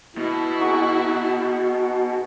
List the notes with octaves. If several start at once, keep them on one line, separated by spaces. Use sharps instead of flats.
B2 E4
D#4 F#4 G#4